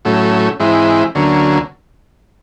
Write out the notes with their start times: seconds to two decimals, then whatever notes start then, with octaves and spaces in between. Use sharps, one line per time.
0.05 A2 F#3 A3 C#4
0.60 G#2 E3 G#3 C4 E4
1.15 D2 D3 F#3 A#3 C#4